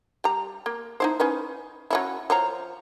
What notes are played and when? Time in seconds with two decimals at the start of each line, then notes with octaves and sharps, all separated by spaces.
0.24 G3 A#5
0.66 A#3
1.00 D#4 E4 C5
1.20 C#4 D#4 B4
1.90 F#3 C#4 E4
2.30 F3 C#5 A#5